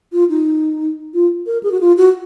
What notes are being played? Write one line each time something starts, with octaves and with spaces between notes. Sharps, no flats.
F4
D#4
F4
A#4
G#4
F#4
F4
F#4